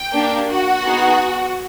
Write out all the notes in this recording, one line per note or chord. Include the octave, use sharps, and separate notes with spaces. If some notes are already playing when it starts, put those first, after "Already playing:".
Already playing: G5
A#3 D4 G4
F#4 F#5
B3 D#4 G#4